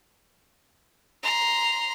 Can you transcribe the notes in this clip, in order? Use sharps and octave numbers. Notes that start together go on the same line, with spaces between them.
A#5 C6